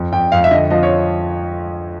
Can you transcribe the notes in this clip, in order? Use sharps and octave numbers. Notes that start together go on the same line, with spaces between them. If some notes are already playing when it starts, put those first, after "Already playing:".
Already playing: F2
F2 G5
F2 F5
E5
D3 D#5
F3 D#5
C#5